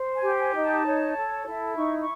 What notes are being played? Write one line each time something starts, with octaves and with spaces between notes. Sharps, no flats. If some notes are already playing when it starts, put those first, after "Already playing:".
Already playing: C5
G#5
G4
G#5
D#4
A5
C#5
A4
E4
D#4 C#6
C#6